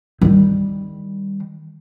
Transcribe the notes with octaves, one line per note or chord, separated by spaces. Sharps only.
D#3 G3